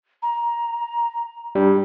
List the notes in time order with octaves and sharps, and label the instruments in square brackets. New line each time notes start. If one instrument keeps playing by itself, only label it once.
[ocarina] A#5
[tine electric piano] G3 D4